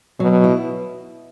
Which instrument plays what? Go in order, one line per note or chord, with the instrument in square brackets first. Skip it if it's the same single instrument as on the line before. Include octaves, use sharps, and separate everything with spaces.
[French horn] B2 [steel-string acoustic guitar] F#3
[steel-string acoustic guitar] E4